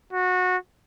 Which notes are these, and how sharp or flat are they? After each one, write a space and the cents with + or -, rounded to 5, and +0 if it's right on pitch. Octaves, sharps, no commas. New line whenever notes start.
F#4 -20